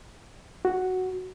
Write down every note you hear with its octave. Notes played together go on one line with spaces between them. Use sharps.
F#4